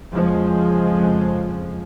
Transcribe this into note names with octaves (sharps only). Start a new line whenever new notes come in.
E2 C#3 F3 G#3
F2 C#3